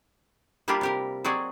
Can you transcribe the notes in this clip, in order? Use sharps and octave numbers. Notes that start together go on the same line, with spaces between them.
G3 A#3 D4 E4 F4 G4
C3 G4 A#4
F#3 C4 F#4 G#4 D5 D#5